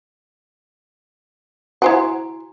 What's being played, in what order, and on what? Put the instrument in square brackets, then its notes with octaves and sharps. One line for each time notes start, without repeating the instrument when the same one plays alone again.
[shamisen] E4 C5 F#5 [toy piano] F#4 G#5 A#5